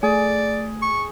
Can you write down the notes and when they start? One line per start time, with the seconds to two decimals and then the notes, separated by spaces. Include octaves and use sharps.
0.03 A3 G#4 D5
0.82 C#6